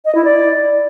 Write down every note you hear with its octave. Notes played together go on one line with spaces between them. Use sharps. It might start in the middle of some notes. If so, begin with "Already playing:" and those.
D#5
E4
D5